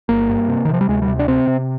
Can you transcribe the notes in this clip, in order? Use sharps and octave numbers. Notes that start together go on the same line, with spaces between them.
G1 A#3
G2
C3
D#3
C3 F3
G3
D2 G#3
G3
C3
D4
C3 C4
C3